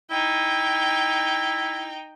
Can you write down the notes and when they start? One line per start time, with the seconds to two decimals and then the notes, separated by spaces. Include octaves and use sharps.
0.11 D#4 E4 G5